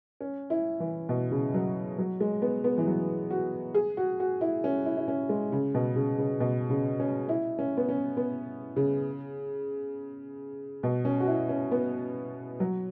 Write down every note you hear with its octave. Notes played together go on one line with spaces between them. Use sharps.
C#4
E4
E3
B2
C#3
F#3
F#3
G#3
B3
B3
E3
F#3
F#4
G#4
F#4
F#4
E4
C#4
E4
E4
C#4
G#3
C#3
B2
C#3
C#3
B2
C#3
C#4
E4
C#4
B3
C#4
B3
C#3
B2
C#4
F#4
E4
C#4
B3
F#3